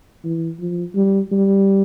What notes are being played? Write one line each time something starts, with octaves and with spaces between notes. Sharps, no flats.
E3
F3
G3
G3